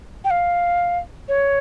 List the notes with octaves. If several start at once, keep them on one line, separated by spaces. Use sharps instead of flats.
G5
F5
C#5